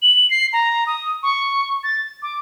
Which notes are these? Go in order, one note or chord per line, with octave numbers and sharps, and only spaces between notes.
F#7
C7
A#5
D#6
C#6
A6
D6